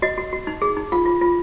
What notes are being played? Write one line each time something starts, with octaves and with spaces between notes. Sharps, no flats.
F#4 D#5
F#4
F#4
D#4
G#4
D#4
F4 F5
F4
F4